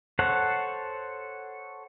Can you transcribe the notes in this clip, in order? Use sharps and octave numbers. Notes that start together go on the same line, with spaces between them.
A4 C5 C#5 F#5